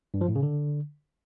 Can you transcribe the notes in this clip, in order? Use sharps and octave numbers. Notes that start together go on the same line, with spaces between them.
G2
F3
A2
C#3
D3